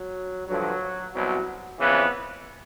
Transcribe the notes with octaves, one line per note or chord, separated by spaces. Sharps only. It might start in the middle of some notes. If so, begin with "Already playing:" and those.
Already playing: F#3
G2 D3 F3 F#3
C2 B2 F#3
F2 C#3 E3 B3